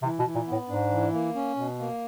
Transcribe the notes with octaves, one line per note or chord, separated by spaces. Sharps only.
C3 E3
B2
E3
A#2
A2 B3
G#2 D4
E3
A#3
C#4
B2
A#3